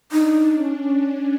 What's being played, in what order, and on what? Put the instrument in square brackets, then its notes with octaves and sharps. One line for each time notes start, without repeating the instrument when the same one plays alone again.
[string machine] D4 [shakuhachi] D#4
[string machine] C#4